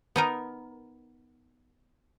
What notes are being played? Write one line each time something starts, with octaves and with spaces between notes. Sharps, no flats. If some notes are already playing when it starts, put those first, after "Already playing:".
B3 D#4 A#4